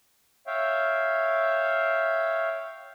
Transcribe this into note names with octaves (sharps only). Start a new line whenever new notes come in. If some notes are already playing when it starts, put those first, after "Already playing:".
C#5 E5 F5 G5